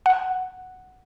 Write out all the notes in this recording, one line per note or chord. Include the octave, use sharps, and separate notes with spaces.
F#5